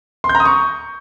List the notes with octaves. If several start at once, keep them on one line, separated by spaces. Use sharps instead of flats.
C6
G6
A#5
D#6
C#6